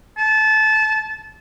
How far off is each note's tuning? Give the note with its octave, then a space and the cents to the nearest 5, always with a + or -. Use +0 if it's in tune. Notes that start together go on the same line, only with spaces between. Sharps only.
A5 -20